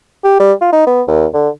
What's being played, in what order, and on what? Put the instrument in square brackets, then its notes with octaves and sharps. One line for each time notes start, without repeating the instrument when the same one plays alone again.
[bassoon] G4
G3
F4
D#4
B3
D#2
D3